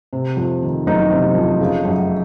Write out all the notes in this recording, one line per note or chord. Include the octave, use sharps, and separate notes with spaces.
C3
F2
D#3
F#1 D#4
C3
F2
C#3
F#2